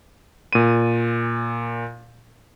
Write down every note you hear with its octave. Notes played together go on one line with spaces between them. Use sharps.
A#2 D#7